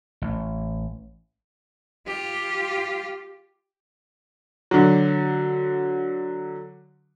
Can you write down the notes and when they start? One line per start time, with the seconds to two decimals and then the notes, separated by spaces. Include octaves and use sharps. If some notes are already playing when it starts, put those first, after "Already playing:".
0.22 A1
2.06 F4 G4
4.71 D3 F#3